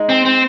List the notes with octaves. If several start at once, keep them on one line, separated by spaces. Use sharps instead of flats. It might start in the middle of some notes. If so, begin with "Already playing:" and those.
Already playing: G#3 D#4 G#4 D#5
C4
C4